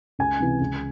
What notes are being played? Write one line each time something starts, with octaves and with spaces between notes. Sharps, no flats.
C#2 G#5
C3 E3
C#2